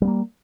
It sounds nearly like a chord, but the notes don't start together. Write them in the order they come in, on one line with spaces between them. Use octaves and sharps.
G3 B3 A#3